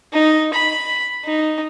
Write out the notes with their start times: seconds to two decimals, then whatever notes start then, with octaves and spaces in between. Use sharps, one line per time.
0.13 D#4
0.54 B5
1.25 D#4